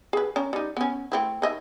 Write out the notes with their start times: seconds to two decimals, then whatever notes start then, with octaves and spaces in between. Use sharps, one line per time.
0.13 G#4 B4
0.36 C#4 A#5
0.53 G3 D#4
0.77 B3 C#4
1.12 A3 C4 E4
1.42 D#3 D#5 E5